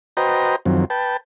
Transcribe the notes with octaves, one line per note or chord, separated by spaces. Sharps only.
F#4 B4 C5 D#5 G5 A#5
F#2 D#3 F3 F#3 C4
B4 G5 A5